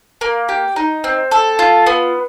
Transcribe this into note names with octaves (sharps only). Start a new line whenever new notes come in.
A#3
G4
D#4
C4
A4
F4
B3